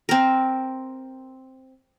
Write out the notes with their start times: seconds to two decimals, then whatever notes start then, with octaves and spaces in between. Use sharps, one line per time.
0.09 C4 A#4